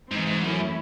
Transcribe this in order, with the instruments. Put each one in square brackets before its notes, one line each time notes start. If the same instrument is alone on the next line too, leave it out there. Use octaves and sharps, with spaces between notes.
[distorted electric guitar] G#2 [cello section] E3 C4 D#4
[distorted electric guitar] G#2
[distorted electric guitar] F#2 [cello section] E3 A3 C#4 E4